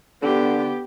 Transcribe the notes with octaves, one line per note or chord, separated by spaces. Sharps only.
D3 B3 G4